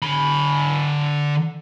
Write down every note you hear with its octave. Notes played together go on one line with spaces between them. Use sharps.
D3 B5